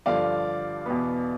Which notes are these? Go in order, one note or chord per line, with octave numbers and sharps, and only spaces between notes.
G2 D3 F3 D5 F5
E2 B2 B3